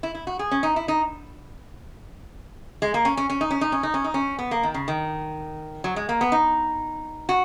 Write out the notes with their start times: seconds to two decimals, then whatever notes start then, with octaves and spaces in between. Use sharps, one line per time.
0.03 E4
0.15 E4
0.27 F#4
0.39 G#4
0.51 C#4
0.63 D#4
0.76 E4
0.88 D#4
2.82 G#3
2.94 A#3
3.05 C#4
3.17 C#4
3.30 C#4
3.41 D#4
3.51 C#4
3.61 D#4
3.72 C#4
3.83 D#4
3.94 C#4
4.04 D#4
4.14 C#4
4.39 B3
4.51 A#3
4.63 D#3
4.74 C#3
4.88 D#3
5.84 F#3
5.96 G#3
6.09 A#3
6.21 B3
6.32 D#4
7.29 F#4